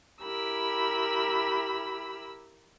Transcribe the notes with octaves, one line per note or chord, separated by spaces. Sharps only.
E4 G4 A#4 B5 E6